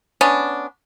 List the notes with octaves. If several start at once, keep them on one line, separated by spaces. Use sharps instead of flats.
B3 C#4 D4